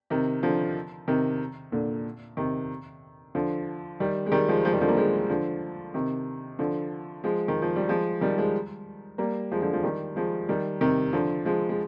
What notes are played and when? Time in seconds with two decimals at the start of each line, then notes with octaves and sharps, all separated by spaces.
0.10 C3 D#3
0.43 D3 F3
1.08 C3 D#3
1.72 A#2 D3
2.37 C3 D#3
3.35 D3 F3
4.00 D#3 G3
4.26 G#3
4.32 D#3 G3
4.48 F3 G#3
4.64 F3 G#3
4.73 D#3 G3
4.81 D3 F3
4.88 G3 A#3
4.97 F3 G#3
5.29 D3 F3
5.94 C3 D#3
6.59 D3 F3
7.24 F3 G#3
7.48 D#3
7.62 F3
7.76 G3
7.89 F3 G#3
8.21 D#3 G3
8.38 F3 G#3
9.18 G3 A#3
9.51 F3 G#3
9.62 D3 F3
9.73 F3 G#3
9.83 D#3 G3
10.16 F3 G#3
10.49 D#3 G3
10.81 C3 D#3
11.13 D3 F3
11.45 F3 G#3
11.69 G#3